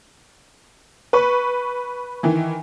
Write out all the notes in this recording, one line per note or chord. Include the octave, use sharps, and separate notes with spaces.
B4 C#6
D#3 E3